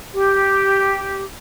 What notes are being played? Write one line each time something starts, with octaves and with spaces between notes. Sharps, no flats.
G4